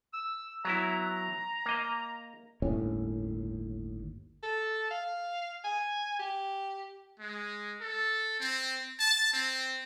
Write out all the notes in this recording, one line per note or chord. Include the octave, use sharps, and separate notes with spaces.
E6
F#3 B3 E4 A#5
A#3 D#5
G1 D#2 A2 C#4
A4
F5
G#5
G4
G#3
A4
C4
A5
C4